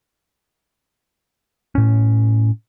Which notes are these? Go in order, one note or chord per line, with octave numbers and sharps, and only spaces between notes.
A2 C#4